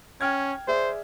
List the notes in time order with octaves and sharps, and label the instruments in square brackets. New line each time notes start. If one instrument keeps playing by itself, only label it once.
[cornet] C#4 [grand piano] G5 F6 G#6
[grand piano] G#4 D5 E5 [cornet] C5